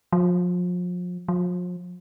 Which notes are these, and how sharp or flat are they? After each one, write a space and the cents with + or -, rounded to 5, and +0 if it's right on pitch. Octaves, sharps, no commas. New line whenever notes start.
F3 +35
F3 +40